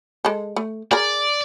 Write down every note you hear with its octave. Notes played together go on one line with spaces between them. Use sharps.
G#3 A4
A3
G#4 A#4 D5